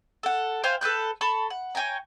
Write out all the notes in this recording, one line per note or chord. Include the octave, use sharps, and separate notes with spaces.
A4 F#5
C5 F5 G5 G#5
A4 B4 F#6 G6
A4 A5 B5 C#6
F#5
C#5 G5 G#5 A#5